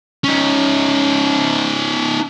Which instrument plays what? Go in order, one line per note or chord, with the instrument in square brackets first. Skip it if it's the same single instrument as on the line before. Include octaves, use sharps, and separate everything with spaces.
[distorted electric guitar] C#4 D#4